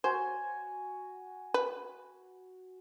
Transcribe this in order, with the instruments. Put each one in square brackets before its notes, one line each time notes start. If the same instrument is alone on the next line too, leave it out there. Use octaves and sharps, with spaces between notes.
[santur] F#4 G#5 [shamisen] C5
[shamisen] B4